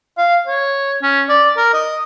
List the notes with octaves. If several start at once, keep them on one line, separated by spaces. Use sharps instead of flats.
F5
C#5
C#4
D5
A#4
D#5